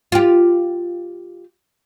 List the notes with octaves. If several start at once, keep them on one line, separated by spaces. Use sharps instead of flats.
F4 G4